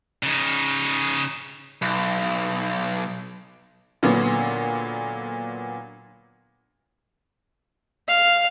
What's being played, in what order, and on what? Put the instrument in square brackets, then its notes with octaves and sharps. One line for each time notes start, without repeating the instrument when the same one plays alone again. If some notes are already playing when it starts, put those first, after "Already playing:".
[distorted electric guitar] C#3 D#4
[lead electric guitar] B1
[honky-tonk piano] A#2 D3 F#3 A#3 B3
[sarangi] F5